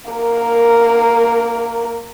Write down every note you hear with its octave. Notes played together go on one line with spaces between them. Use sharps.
A#3 A#4